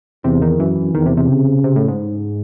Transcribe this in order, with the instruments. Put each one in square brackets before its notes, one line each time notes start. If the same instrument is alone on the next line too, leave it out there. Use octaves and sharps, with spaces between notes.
[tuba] E2 [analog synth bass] C3
[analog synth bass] D#3
[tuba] F#2 [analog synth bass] E3
[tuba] E2 [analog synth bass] D#3
[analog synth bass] C3
C3
[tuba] C#3
[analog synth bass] C3
A2
G#2